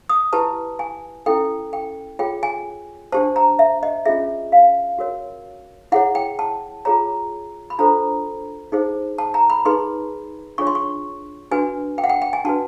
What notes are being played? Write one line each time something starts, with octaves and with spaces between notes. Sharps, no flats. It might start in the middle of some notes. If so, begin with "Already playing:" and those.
D#6
E4 G4 B4 A5
G#5
C#4 E4 A4 G5
G5
F4 G#4 C#5 G5
G#5
D4 G4 C5 A5
A#5
E5
D#5
C#4 F4 G#4 E5
F5
F#4 A#4 C#5
E4 G#4 C#5 F#5
G5
A5
F4 G#4 C#5 A#5
B5
D4 F4 A4 C5 A#5
D#4 G#4 C5
A5
A#5
B5
D#4 G#4 B4 C6
D4 F4 G#4 C#5 C#6
C6
C#6
D4 F#4 B4 G#5
G5
F#5
G5
G5
G#5
D4 F#4 B4 A5